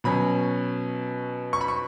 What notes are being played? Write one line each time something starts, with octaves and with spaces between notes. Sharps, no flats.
B2 F#3 C#4 B5
C#6
B5
C#6